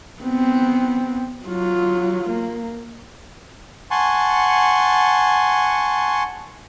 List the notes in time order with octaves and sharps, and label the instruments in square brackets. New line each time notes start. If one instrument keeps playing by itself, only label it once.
[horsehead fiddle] B3 C4
F#3 F4
A#3
[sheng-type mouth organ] F#5 G#5 A5 C6 C#6